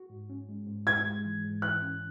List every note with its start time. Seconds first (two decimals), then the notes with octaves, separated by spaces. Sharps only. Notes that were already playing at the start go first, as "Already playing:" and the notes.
Already playing: F#4
0.10 G#2
0.30 C#4
0.49 G#3
0.67 G#2
0.87 G#2 G#6
1.06 G#3
1.25 E3
1.44 G#2
1.62 E3 F#6
1.82 C#4